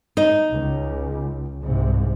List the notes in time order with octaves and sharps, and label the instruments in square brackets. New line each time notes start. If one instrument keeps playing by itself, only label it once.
[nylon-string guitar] D#4
[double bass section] C#2
C2 G#2 C3